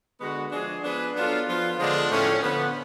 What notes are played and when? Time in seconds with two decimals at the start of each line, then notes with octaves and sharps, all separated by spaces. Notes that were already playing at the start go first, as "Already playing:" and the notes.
0.21 D3 G#3 B3 F#4
0.52 F3 G#3 D4 G#4
0.83 F3 B3 D4 G#4 B4
1.16 F#3 B3 D4 F4 A4
1.47 F3 B3 F4
1.79 D3 F3 G#3 B3 D4
2.11 A2 F3 A3 C#4
2.42 D3 F3 B3